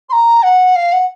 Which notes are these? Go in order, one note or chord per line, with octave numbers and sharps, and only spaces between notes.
C6
A#5
F#5
F5
F#5